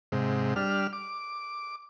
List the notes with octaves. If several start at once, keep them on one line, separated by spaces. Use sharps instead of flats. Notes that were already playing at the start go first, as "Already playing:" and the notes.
G#2 C3
G3 D4 F6
D6